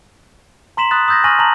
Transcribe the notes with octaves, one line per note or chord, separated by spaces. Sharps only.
A#5 C6 B6 E7 F#7
B5 D#6 F#6 A6
D#6 E6 G6 A6 A#6
G#5 C#6 F6 A#6 D#7 F#7
A5 A#5 F#7